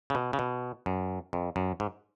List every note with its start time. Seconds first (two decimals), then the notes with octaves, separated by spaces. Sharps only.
0.10 C#3
0.15 B2
0.33 C#3
0.39 B2
0.86 F#2
1.33 F2
1.56 F#2
1.80 G#2